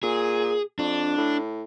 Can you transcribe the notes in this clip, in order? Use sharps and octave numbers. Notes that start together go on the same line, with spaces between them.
A#2 G#4
F2 D4
A2